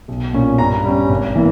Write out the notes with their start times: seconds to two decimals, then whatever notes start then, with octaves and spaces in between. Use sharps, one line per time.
0.08 B1
0.33 A#2 A#3 C#4
0.58 G2 A#5
0.84 G3 C#4
1.09 G#1
1.35 E3 A#3